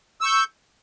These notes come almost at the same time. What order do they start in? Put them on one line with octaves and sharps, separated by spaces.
E6 C#6 G6